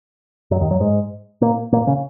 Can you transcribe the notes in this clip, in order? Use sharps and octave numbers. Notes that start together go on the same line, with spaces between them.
F#2 F#3
D#2 D#3
F#2 F#3
G#2 G#3
A#2 A#3
A#2 A#3
C#3 C#4